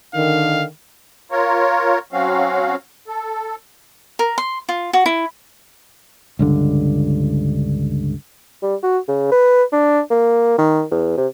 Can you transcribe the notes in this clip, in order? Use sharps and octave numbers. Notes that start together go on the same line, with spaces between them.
D3 D#3 F5
F4 A#4 C#5
F#3 C4 C#4 F#4 F5
A4
A#4
C6
F4
F#4
E4
C#2 G2 D3
G3
F#4
C#3
B4
D4
A#3
D#3
E2
C3